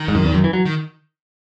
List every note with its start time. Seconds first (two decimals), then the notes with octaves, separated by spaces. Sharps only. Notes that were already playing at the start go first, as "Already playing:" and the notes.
Already playing: D#3
0.08 G#2
0.15 F#2
0.25 E2
0.34 F#2
0.44 E3
0.53 F#3
0.65 D#3